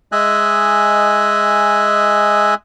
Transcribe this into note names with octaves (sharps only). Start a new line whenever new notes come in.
G#3 D#5 E5 G#5 F#6